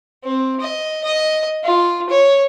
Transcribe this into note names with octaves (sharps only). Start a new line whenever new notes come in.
C4
D#5
D#5
F4
C#5